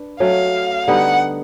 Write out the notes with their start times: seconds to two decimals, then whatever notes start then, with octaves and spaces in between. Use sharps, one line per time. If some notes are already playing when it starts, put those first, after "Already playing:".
Already playing: D4 B4
0.20 F#3 A3 C#4 F5
0.88 D3 G3 B3 D#4 F#5